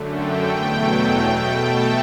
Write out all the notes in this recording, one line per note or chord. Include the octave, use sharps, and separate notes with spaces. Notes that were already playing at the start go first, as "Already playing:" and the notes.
Already playing: F#2 D3 A3
G5
E2 B2 F#3 A3
G5
B2 A3
A5